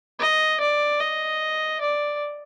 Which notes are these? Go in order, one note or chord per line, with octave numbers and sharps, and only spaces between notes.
D#5
D5
D#5
D5